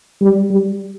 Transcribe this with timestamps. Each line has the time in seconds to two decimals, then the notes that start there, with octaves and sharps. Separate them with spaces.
0.22 G3
0.51 G3